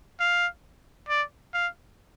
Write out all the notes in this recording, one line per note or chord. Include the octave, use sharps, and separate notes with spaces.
F5
D5
F5